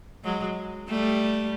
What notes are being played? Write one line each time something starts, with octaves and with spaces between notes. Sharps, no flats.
F#3 G#3
G3 A3